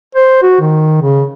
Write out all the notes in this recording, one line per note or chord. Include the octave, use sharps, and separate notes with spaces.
C5
F#4
D#3
C#3